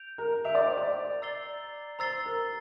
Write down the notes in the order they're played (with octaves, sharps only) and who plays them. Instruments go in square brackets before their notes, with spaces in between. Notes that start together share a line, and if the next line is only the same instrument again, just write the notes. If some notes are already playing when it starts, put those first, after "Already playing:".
Already playing: [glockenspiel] G6 D7 F7
[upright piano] A#4
[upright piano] E5 [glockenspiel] G6 D7 F7
[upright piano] D5
C5
D5
[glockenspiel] A#5 E6 A6 C7 G7
[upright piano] C5 [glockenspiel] A#5 E6 A6 C7 G7
[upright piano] A#4